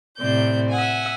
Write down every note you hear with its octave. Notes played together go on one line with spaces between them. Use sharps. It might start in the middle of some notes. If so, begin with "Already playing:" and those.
A2 C3 C4 D5 G6
E5 F#5 G#5